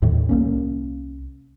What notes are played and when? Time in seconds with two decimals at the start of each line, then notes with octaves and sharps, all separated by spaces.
0.02 D#2 A2 D#3
0.29 C2 A#3 C#4